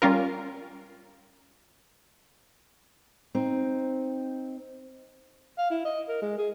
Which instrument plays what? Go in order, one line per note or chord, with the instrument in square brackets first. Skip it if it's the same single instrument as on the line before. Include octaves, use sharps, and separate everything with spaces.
[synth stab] G3 C#4 F4 A#4
[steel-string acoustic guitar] C4 D#4
[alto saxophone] F5
E4
D#5
A#4
G#3
G#4